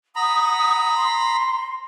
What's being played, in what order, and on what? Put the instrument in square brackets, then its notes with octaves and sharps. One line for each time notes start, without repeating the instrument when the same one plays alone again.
[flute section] F#5 D#6 [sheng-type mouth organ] A#5 B5
[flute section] C6